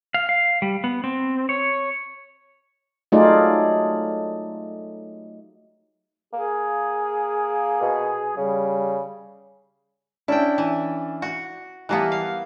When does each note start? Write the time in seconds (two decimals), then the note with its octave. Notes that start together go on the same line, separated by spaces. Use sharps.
0.14 F5
0.29 F5
0.62 G3
0.84 B3
1.04 C4
1.49 C#5
3.12 F#3 A3 D#4 F4 G#4 D5
6.33 A#3 G#4
7.82 B2
8.37 C#3 G3
10.28 C#4 D4 E4 D5 G5
10.58 E3
11.22 F#4
11.89 E3 G3 A#3 B3 A5 F#6
12.12 F5